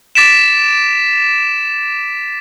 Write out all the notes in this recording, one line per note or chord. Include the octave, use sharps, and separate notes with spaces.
D6 A6 B6 D7 E7